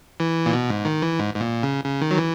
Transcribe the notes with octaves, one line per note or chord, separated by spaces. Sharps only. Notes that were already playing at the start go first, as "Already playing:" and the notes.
E3
A#2
B2
G#2
D#3
E3
G#2
G#2
A#2
C#3
C#3
D#3
F#3
E3